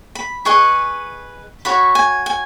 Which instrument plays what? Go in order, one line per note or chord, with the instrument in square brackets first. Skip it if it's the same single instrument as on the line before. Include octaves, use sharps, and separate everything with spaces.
[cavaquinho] B5
G#4 B4 D#5 C#6
F#4 C#5 B5
G#5
G#5